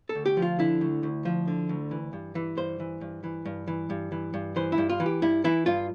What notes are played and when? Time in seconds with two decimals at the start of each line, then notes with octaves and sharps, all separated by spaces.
0.09 A4
0.15 D2
0.26 G4
0.37 F3
0.42 F4
0.59 D3 E4
0.81 D2
1.03 D2
1.25 F3
1.48 D3
1.69 D2
1.91 E3
2.13 G2
2.35 E3
2.57 G2 C5
2.80 E3
3.01 G2
3.24 E3
3.45 G2
3.68 E3
3.90 G2
4.12 E3
4.34 G2
4.56 E3 C5
4.72 E4
4.78 G2
4.90 F4
5.00 E3
5.06 G4
5.22 G2 E4
5.44 E3 E4
5.66 G2 F4